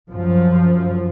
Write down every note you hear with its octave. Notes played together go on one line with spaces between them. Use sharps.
F#2 F3